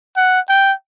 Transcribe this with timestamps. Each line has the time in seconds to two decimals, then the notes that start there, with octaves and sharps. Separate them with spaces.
0.16 F#5
0.49 G5